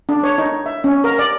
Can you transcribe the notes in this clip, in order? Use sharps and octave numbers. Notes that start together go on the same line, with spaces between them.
D4
C#5
D#4
E5
C#4
A#4
D5